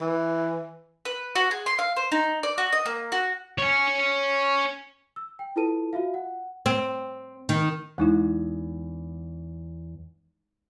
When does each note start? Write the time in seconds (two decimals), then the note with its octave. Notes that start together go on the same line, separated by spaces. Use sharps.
0.01 E3
1.05 B4
1.36 F#4
1.51 G#4
1.66 C6
1.79 F5
1.97 C5
2.12 D#4
2.43 D5
2.58 F#4
2.73 D#5
2.86 A#3
3.12 F#4
3.58 C#5 G#5
5.16 E6
5.39 G5
5.56 E4 F4 A4 B4 A5 D#7
5.93 F4 F#4 E5 F5
6.14 F#5
6.66 C4
7.49 D#3
7.98 E2 G#3 D#4 E4